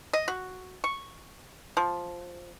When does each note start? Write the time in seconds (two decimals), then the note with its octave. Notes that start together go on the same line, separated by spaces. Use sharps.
0.13 D#5
0.28 F#4
0.84 C#6
1.77 F3